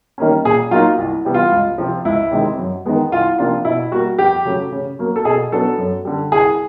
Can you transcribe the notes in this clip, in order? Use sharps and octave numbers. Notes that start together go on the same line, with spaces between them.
D#3 G3 A#3 C#4
A#2 G#4
F#3 A#3 D#4 F4
C2
C3 E3 G3 B3
F4
C#2
C3 F3
C#2 E4
C3 D#3 G#3 C4
F#2
D#3 G#3 B3
C2 F4
C3 F3 A#3 D4 F4
B2 E4
G3 A#3 F#4
F2 G4
C#3 F#3 A3
C#3
F#3 A#3
A4
B2 G#4
F#3 B3 D4 A4
F#2
D3 G3
C2 G#4